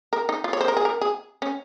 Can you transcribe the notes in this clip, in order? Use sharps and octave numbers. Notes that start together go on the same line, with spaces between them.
A#4
D#4
F4
C#5
C5
A#4
G#4
A#4
G#4
C#4